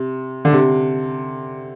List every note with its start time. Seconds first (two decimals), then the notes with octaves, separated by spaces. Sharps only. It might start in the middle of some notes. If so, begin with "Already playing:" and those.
Already playing: C3
0.45 D3
0.53 C3